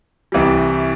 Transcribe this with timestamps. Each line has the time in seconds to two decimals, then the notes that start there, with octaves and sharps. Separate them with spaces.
0.32 C2 C3 E3 G3